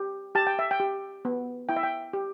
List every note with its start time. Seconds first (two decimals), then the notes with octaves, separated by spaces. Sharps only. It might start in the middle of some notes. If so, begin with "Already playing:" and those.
Already playing: G4
0.35 G4 A5
0.47 G5
0.59 E5
0.71 G5
0.80 G4
1.25 B3
1.69 E4 G5
1.76 E5
1.83 G5
2.13 G4